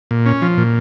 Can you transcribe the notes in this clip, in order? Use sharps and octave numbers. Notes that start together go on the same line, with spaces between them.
A#2
C#4
F3
A#2